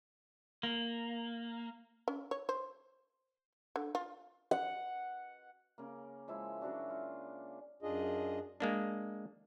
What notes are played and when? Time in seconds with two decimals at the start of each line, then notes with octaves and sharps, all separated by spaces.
0.63 A#3
2.08 C#4
2.31 C#5
2.49 C5
3.76 D3
3.95 F4
4.51 F#5
5.78 C#3 A#3
6.28 F3 G#3 E4 E5
6.61 C#3 F#3 D4 F#4
6.90 F4
7.82 F#2 D4 F4 G#4 D#5
8.60 G#3 A#3 D4